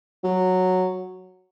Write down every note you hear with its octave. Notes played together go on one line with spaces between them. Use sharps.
F#3